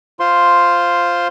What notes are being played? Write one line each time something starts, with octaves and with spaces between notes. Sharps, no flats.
F4 C5 C6